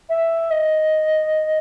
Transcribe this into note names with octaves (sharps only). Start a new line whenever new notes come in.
E5
D#5